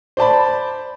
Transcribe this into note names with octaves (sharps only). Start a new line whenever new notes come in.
C5 D5 A5 B5